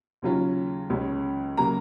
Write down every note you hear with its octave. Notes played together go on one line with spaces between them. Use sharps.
D#2 C#3 F#3 C#4 F4
C#2 C#3 G#3 C#4
C#3 F#3 A#3 A#5